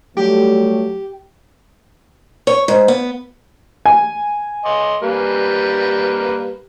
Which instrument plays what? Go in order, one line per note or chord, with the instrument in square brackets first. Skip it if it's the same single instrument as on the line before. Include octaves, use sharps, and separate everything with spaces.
[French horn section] F#3 G3 A3 [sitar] G4
[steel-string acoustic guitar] C#5
G#2
B3
[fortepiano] G#5
[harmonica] D#5 C6 D6
G3 A#3 B4